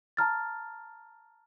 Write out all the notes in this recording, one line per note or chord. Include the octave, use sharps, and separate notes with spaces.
A5 A#5 F6 A6